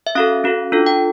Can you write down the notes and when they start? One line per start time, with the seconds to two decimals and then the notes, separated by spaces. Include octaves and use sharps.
0.07 E5
0.15 C#4 F#4 A4 F5
0.44 C#4 F#4 A4
0.72 D4 F4 A4
0.86 G5